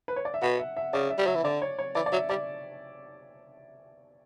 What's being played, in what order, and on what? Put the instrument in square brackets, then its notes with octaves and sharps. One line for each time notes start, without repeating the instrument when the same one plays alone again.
[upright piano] B4
C#5
D5
E5
[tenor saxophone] B2 [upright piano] F#5
[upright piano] E5
E5
[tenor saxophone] C#3 [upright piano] D5
[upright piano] E5
[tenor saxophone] G3
[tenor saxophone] F#3 [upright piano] E5
[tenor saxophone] E3
[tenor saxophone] D3 [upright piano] D5
[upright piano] C#5
C#5
[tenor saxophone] E3 [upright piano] D5
[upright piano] D5
[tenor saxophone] F#3 [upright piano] E5
[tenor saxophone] G3 [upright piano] D5